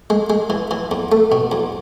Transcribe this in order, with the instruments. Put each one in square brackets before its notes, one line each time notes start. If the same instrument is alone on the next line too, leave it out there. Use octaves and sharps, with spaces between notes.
[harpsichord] G#3
G#3
E3
E3
E2
A3
B2
E2